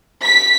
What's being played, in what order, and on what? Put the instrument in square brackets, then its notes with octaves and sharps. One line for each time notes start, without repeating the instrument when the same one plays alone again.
[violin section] B6